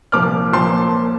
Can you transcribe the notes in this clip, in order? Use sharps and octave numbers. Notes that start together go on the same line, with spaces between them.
C2 A#2 F3 D6 F6
A#2 F3 A5 C6